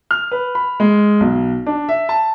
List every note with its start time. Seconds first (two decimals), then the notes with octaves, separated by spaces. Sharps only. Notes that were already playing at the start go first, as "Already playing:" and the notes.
0.11 F6
0.32 B4
0.55 B5
0.80 G#3
1.20 B1
1.66 D4
1.89 E5
2.09 A5